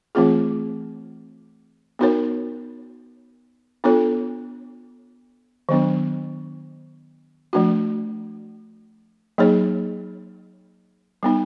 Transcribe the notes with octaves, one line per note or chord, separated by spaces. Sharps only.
E3 A3 C4 F4 G#4
B3 D#4 F#4 A#4 C#5
B3 D4 F4 A4 C#5
D#3 F#3 B3 D4
F3 A3 D4 F#4
F#3 A#3 D#4 G#4 C#5
G3 B3 D#4